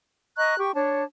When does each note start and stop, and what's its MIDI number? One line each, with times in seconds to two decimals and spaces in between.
0.38 0.58 75
0.38 0.58 82
0.38 0.58 85
0.38 0.58 90
0.58 0.73 67
0.58 0.73 79
0.58 0.73 85
0.75 1.04 62
0.75 1.04 73
0.75 1.04 81